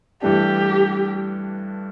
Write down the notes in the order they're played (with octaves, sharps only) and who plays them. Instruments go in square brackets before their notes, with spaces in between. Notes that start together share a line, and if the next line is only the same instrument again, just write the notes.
[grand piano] G2 E3 A3 D4 [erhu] G4